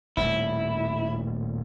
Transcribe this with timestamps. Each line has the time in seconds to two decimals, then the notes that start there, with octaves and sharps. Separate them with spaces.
0.17 D#1 A2 G3 E4